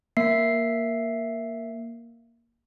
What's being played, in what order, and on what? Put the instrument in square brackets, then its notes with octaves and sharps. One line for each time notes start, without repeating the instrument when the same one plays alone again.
[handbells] A#3 E5 C7